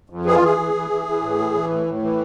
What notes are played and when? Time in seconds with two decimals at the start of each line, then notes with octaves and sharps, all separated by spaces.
0.10 F2
0.25 E3 G#4
0.35 F4
0.42 E3 G#4
0.58 E3
0.73 E3
0.90 E3
1.06 E3
1.22 A2
1.38 E3
1.54 E3
1.69 A2
1.86 A2
2.02 E3